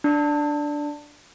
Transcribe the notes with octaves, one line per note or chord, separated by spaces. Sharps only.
D4